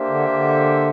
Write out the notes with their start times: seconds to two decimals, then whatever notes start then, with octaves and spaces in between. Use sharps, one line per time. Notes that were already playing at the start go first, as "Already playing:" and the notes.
Already playing: A#3 D4 G4 C5 E5
0.08 D3
0.32 D3